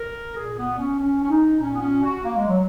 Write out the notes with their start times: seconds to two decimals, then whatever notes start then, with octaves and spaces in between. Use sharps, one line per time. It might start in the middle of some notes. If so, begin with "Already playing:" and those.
Already playing: A#4
0.35 A#2 G#4
0.57 B3
0.78 C#4
0.99 C#4
1.24 C#4
1.29 D#4
1.60 A#2 C#4
1.74 B3
1.81 C#4
2.03 F#4
2.23 A#3
2.36 G#3
2.48 F#3